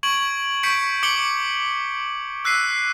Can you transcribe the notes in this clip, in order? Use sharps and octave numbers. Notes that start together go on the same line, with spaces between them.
C#6 G#6 D7 F#7
C#6 G6 B6 C#7 D7
D6 C#7 F#7 G7
E6 F#6 B6 C7 D#7